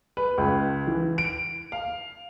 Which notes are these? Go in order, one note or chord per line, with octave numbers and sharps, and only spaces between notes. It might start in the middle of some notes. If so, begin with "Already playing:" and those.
B4
C#2
E3
D7
F5